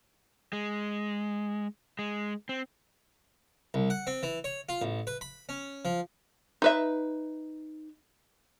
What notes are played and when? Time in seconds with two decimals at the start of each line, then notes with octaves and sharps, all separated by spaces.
0.53 G#3
1.99 G#3
2.49 C4
3.74 C2
3.90 F#5
4.07 C4
4.23 E3
4.44 C#5
4.69 F4
4.82 A1
5.07 B4
5.21 B5
5.49 C#4
5.85 F3
6.62 D#4 B4 E5